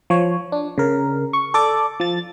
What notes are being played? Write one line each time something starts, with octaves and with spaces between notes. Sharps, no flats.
F3 C#5
D4
C#3 A#4
C#6
A4 D5 D6
F3 A6